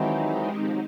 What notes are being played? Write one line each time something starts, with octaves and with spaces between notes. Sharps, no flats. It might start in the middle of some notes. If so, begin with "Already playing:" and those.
Already playing: D#3 E3 F#3 G#3 C4 D#4 G4
F3
F#3